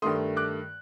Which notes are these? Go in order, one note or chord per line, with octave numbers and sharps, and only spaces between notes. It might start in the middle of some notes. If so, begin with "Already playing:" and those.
G2 D#3 A3 C6 D#6
D6 F#6